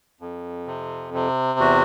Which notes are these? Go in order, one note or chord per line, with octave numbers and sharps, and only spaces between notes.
F2
C3
C3
E2 F#4